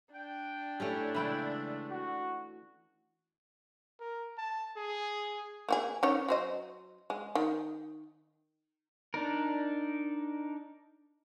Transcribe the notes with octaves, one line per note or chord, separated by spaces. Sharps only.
D4 G5
A3 C#4 E4 G4
C#3 E3 G#3 A3 E4 G5
F#4
A#4
A5
G#4
A#3 F#4 G#4
D#3 C#4 C#5
F#3 C5 D#5
G#3
D#3
D4 D#4 A#4